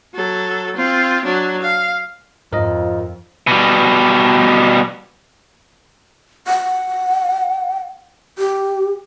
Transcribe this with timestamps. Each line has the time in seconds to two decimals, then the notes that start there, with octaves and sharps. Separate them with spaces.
0.14 F#3 A4
0.76 C4 F4
1.24 F#3 D4
1.62 F5
2.53 F2 G#2 F3 A#4 D#5
3.47 B2 G3
6.47 F#5
8.38 G4